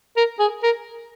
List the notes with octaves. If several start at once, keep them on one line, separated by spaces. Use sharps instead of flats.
A#4
G#4
A#4